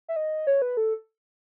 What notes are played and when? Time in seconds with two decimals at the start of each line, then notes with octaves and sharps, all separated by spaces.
0.09 E5
0.16 D#5
0.47 C#5
0.62 B4
0.77 A4